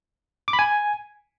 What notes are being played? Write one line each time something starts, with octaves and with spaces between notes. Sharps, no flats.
D6
B5
G#5